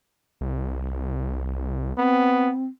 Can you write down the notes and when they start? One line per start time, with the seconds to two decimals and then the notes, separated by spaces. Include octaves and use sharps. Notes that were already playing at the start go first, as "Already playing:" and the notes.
0.41 C2
1.98 B3 C4